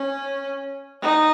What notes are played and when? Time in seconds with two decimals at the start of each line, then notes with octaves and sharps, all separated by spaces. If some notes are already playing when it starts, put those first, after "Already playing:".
Already playing: C#4
1.02 D#4